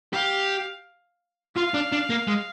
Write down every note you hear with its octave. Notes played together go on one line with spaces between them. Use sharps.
G4 F5
F4 F5
D4
D4
A#3
G#3